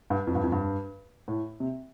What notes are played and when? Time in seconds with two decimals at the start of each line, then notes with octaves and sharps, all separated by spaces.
0.10 G2
0.27 F2
0.35 G2
0.43 F2
0.52 G2
1.28 A2
1.60 C3